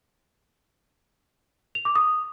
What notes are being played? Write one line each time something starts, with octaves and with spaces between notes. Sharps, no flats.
F7
D6
D#6